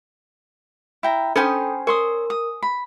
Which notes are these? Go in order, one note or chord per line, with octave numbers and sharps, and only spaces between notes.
E4 G5 A#5
C#4 A4 C5 G5 G#5 B5 D#6
A#4 C#5 C6 D#6
D#6
B5